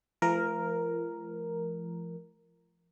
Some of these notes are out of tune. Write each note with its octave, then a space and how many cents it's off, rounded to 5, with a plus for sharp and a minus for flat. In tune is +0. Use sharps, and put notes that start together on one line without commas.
F3 -40 A3 -40 A#4 +0